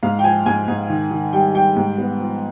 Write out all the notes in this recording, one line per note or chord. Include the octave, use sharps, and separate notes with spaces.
G#2 F5
G5
F3 G#5
G#2 G#5
G#2
D#3
D#3
G3 G5
G3 G5
G#2
B3
F3